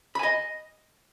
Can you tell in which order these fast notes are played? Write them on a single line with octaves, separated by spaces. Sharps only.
B5 G#5 D#5